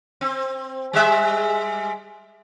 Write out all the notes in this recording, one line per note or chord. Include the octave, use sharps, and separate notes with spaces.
C4
G3 G#3 E5